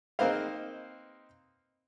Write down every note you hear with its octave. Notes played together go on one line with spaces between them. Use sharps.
A#3 C4 D#4 B4 C5 F5